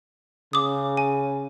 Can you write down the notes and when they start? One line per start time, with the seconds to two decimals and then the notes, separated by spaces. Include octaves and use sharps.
0.53 C#3 D6 D#6
0.97 G#5